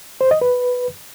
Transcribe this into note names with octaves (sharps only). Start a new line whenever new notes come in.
C5
D#5
B4